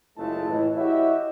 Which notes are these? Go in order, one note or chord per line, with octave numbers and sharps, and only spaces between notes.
F#1 G#3 A3 E4 F4 A5
A2 E3 D#5
E4 F#4 G4 C#5 D#5 E5